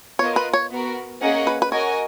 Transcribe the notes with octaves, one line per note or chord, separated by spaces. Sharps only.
B3 F4 A#4 C#5 D#5
B4
C#5
B3 F#4 A#4
A#3 C#4 G#4 D#5 F#5
B4
B4
F#4 A#4 C#5 D#5 G#5